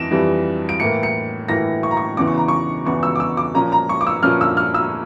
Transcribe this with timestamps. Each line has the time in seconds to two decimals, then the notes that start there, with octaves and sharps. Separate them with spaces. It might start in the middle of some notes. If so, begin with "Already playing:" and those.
Already playing: F2 E3 A#6 D7 E7
0.11 F2 E3 G3
0.69 D7
0.80 A2 E3 A#3 C#7
1.03 C#7
1.48 A2 E3 A#3 A#6
1.83 C#6
1.91 A#5
1.97 C#6
2.17 E2 C#3 E3 D6
2.27 C#6
2.37 A#5
2.48 C#6
2.85 E2 C#3 E3 C#6
3.03 E6
3.15 D6
3.20 E6
3.37 D6
3.54 A#2 F3 C#4 A#5
3.72 A#5
3.89 C#6
4.01 D6
4.07 E6
4.23 A#2 F3 C#4 F6
4.41 E6
4.57 F6
4.74 E6